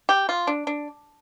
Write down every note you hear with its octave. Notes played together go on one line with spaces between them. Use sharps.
G4
F4
D4
D4